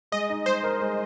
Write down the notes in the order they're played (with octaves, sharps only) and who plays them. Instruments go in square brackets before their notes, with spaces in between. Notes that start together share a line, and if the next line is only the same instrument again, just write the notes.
[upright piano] G#3 [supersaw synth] D#5
[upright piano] D#4
[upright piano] G#3 [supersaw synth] C5
[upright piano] A#4
G#3